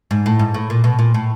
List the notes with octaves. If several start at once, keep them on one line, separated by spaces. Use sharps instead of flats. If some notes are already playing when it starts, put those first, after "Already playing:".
G#2
A2
G#2
A2
A#2
B2
A#2
A2